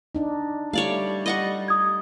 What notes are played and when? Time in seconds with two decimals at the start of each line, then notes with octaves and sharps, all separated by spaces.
0.15 D4 D#4
0.73 G3 A3 C#5 D5 F5
1.26 D#5 F#5 C#6
1.68 D#6 G#6